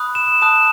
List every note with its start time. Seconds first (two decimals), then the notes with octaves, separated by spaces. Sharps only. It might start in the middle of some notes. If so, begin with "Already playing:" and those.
Already playing: B5 D#6 F#6
0.15 E7
0.41 A5 D#6 F#6 E7